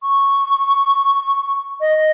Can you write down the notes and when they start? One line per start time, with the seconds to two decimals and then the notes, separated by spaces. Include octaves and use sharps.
0.03 C#6
1.81 D#5